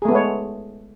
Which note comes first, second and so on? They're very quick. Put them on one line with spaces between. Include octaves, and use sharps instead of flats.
G#4 A3 B3 G#3 C#5